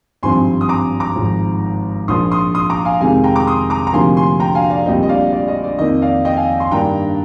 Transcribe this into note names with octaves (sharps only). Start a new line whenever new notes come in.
G#1 G2 F3 C4 G#5 C6
D#6
A#5 D6
A#5 D6
G#1 G#2 F3
A#1 A#2 F3 A#3 C6 D#6
C6 D#6
C6 D#6
A#5 D6
F5 G#5
F2 C3 D#3 G#3 F5 G#5
G5 A#5
A#5 D6
C6 D#6
A#5 D6
A#5
D2 C3 F3 A#3 D#4 G#5 C6
G#5 C6
G5 A#5
F5 G#5
D5 F5
A#1 A#2 G3 C4 D#5 G5
D#5
D5 F5
D5
D#5
D5
F2 D#3 A#3 D#4 D#5
D5 F5
D#5 G5
F5 G#5
G#5 C6
G2 D#3 A#3 D4 G5 A#5